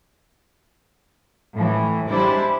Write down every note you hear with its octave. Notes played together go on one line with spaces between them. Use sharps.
A2 E3
G3 G#3 D4 E4 C5